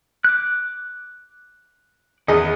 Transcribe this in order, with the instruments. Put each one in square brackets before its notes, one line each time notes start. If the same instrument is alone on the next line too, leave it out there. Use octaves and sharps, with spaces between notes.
[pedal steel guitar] D6 F#6
[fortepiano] E2 D#5 [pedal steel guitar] D#3 B3 [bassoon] G#4